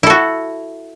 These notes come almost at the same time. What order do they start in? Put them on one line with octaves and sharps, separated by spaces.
E4 A4 F#4